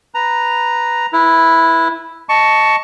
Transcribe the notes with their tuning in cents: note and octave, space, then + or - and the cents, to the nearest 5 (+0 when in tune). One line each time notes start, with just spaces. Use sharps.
B4 +0 A#5 +0
E4 +0 B4 -30
D#5 +0 A5 +0 C#6 +10